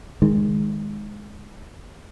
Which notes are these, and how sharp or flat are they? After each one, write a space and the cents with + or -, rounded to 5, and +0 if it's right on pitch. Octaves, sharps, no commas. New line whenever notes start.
D#3 +0 G#3 +0